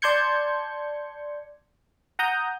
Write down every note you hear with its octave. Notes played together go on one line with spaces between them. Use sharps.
D5 A5 C6 G6 G#6 C#7
F#5 A#5 D#6 G6